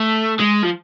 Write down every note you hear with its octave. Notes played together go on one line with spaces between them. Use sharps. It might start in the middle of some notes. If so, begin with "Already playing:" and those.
Already playing: A3
G#3
F3